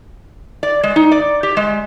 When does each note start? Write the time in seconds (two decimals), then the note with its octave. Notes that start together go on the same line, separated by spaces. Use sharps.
0.63 D5
0.83 G#3
0.96 D#4
1.11 D5
1.43 G4
1.57 G#3